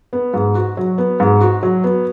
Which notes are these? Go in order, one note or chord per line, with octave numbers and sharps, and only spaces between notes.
B3
G#2
F#4
F#3
B3
G#2
F#4
F#3
B3